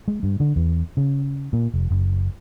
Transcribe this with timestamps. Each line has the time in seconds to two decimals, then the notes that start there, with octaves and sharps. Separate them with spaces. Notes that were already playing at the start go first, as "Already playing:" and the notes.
0.08 G#3
0.23 G2
0.40 D3
0.56 E2
0.97 C#3
1.53 A#2
1.74 F1
1.91 F#1